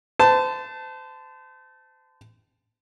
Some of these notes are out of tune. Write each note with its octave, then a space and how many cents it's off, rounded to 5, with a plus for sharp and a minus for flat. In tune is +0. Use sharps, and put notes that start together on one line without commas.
C5 -35 A5 +0